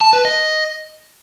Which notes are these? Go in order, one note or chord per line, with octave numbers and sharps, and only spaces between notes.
A5
B4
D#5